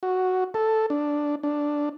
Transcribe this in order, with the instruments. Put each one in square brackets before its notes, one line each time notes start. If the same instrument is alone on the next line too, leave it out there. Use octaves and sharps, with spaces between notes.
[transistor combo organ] F#4
A4
D4
D4